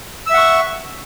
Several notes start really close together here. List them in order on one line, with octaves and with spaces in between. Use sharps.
E6 E5 F#5 C#6